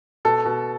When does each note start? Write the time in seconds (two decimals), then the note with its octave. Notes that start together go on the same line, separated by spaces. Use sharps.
0.25 B2 A4
0.45 B2